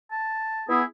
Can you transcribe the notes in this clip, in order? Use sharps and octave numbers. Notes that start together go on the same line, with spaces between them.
A5
B3 E4 G#4